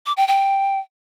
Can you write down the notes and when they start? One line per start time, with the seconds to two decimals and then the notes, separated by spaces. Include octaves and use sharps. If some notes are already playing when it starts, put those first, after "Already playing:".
0.06 D6
0.17 G5
0.28 G5